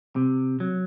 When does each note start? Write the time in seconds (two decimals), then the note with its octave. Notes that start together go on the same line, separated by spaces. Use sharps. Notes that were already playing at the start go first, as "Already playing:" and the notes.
0.16 C3
0.60 F#3